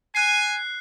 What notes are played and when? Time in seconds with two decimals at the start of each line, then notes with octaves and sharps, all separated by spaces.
0.15 G#5 F#6 C7